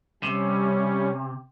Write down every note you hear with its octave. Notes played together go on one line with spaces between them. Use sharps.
C3 G3 C#4